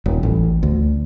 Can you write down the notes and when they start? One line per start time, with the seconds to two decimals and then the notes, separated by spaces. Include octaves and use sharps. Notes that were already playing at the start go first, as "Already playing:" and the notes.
0.06 D#1
0.23 A1
0.63 D2